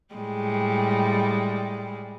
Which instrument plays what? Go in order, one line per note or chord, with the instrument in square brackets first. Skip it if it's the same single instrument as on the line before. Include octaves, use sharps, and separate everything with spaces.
[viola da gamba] A2 G3 G#3